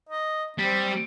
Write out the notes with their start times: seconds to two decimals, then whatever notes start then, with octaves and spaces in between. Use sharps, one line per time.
0.09 D#5
0.58 G3 C4